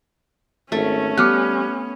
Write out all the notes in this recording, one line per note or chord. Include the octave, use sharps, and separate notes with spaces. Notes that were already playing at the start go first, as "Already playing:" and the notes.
G#1 A3 C#4
G3 B3 D6 F6 F#6